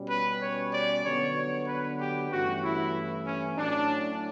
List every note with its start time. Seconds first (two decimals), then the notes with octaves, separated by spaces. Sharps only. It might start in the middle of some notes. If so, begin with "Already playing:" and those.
Already playing: B2 G3 C#4
0.08 B4
0.40 C#5
0.72 D5
1.04 D3 F#3 B3 C#5
1.35 C#5
1.67 B4
1.99 G4
2.30 G2 E3 A3 C#4 F#4
2.63 E4
3.25 C#4
3.57 A2 F#3 C#4 D4